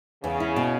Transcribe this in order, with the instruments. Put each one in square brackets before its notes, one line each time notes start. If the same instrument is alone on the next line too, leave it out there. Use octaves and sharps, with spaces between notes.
[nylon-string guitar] E2 [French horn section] C#3
[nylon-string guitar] E4
B2